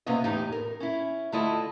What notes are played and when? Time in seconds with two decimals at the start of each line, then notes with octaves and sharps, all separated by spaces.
0.06 C3 A#3 B3 C#4 D#5
0.24 E2 A2 D#4 G4
0.52 A#4
0.80 C#4 E4
1.32 D3 A3 E4 F4 D#5